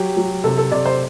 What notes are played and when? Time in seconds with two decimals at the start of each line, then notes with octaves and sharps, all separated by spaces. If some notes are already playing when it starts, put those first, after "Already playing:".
Already playing: F#3 G4
0.17 F#3
0.44 C3 A4
0.58 A4
0.72 C3 D5
0.85 C5